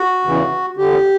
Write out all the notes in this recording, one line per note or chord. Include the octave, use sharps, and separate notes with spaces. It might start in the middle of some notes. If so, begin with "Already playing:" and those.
Already playing: F#4
E2 C#3 E3
E2 D3 G4